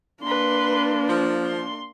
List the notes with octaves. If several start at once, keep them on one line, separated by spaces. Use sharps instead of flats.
A#3 D4 B4 C6
F3
C6